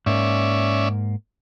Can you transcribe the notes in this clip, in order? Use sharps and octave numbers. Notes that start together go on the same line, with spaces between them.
G#2 A#3 C#4 D5 E5